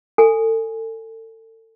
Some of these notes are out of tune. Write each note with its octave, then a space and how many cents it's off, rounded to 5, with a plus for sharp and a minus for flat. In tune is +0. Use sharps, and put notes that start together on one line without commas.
A4 +35 G#5 +0